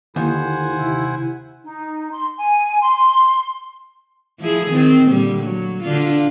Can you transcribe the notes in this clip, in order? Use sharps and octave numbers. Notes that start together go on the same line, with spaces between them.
D#2 D3 E4 C5 F#5 G#5
C3 E4
D#4
C6
G#5
C6
F3 E4 G#4
D#3 C4
A#2 D3 G3
F#3
D3 D4 F4